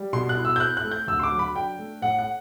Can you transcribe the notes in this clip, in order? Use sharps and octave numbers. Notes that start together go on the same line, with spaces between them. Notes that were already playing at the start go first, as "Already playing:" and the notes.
Already playing: G3
B2 C6
F#6
E4
E6
G6
C4 F#6
F#6
A3
G6
D2 E6
C6
D6
F#3
B5
D4 G5
A3
A2 F#5
F#5